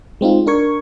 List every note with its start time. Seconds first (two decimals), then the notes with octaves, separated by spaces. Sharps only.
0.21 G#3 C4 D#4 F4
0.46 D4 A#4 C#6 G#6